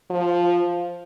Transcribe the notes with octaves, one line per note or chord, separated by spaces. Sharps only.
F3